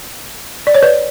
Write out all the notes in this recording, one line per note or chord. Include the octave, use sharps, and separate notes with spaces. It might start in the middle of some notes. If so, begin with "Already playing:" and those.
D5
C#5
B4 D5